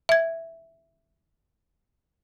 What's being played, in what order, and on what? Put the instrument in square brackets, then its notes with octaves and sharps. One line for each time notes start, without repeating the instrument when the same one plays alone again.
[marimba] E5 G#6